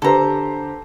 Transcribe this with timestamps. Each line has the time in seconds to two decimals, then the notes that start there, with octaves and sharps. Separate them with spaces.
0.02 D3 G4 A4 C5 A#5